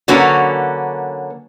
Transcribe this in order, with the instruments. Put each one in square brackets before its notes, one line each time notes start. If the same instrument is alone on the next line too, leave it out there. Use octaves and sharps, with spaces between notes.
[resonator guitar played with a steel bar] D3 F#3 A#3 C#4 F#4 B4